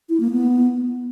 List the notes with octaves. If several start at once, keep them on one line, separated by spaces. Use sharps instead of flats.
E4
A#3
B3